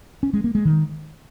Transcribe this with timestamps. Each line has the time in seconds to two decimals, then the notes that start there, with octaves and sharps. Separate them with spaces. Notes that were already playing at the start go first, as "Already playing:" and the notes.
0.23 C#4
0.33 G#3
0.44 A#3
0.55 G#3
0.65 D#3